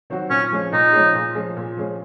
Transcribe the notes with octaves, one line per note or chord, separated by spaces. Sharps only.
D#3 F#3 C4 F#4
A#2 C#4
F3 G#3 C#4 G#4
A#2 D#4
F3 G#3 C#4 G#4
A#2
F3 G#3 C#4 G#4
A#2
F3 G#3 C#4 G#4